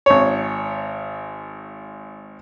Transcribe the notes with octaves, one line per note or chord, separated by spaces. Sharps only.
G#1 C#5